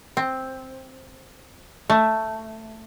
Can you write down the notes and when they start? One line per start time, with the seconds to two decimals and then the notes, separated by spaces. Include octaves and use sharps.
0.17 C4
1.90 A3